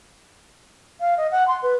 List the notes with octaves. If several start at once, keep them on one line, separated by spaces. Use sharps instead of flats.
F5
D#5
F#5
C6
B4